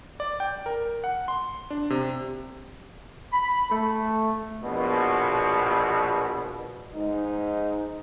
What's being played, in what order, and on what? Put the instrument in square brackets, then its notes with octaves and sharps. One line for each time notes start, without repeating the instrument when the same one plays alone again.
[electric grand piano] D5
G5
A#4
F#5
C6
D4
C3
[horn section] B5
A3
[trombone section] A#1 B2
G#2 D#4